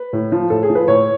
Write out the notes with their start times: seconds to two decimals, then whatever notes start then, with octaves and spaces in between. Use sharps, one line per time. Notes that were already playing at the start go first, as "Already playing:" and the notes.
Already playing: B4
0.13 A2
0.32 F3
0.50 A2 A4
0.63 G#4
0.70 F3
0.75 B4
0.88 A2 C#5